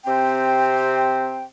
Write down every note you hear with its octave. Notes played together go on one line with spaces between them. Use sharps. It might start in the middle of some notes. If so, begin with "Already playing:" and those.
C3 C4 C5 G5